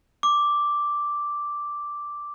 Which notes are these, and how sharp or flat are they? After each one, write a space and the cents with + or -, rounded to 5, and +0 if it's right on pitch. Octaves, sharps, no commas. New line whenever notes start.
D6 +0